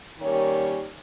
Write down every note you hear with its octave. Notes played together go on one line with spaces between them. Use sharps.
D#3 G3 A#3 C#4 C#5